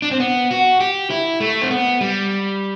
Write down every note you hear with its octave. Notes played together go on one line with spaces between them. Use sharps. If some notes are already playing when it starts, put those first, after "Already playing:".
D4
C4
B3
F#4
G4
E4
A3
C4
B3
G3